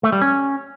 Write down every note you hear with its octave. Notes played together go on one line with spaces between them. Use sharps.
A3
G3
C#4